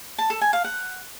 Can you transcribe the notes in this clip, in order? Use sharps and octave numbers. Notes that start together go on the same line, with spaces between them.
A5
A4
G#5
F5
F#5